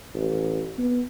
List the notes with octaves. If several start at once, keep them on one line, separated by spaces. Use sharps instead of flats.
A1
B3